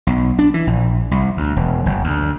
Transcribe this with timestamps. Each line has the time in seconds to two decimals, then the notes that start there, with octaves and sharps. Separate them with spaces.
0.07 B1
0.39 D4
0.54 E3
0.67 A#1
1.11 C2
1.37 D2
1.56 E1
1.86 F#1
2.04 D2